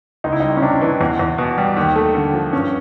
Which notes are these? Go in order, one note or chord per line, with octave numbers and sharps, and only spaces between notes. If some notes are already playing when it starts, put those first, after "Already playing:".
C#2 D#4
E4
G3 D#4
C#4
C3 D4
E3
E2
E2
B2
G3
D#2
A3
D3
F3
G2 C#4